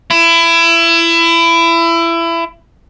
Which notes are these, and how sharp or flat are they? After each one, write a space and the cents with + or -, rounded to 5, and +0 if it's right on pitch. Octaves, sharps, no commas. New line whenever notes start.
E4 +25